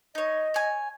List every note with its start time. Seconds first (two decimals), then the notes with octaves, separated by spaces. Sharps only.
0.15 D#4 C#5 D#5
0.54 C#5 G#5